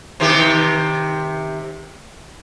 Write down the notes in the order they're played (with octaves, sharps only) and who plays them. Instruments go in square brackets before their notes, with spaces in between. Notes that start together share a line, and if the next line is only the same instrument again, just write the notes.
[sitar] C3 D#3 G4